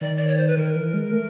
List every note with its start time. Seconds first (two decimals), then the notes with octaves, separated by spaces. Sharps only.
0.01 D#3 D5
0.17 D5
0.27 C#5
0.37 C5
0.47 B4
0.57 D#3 A#4
0.76 E3
0.94 G#3
1.12 A3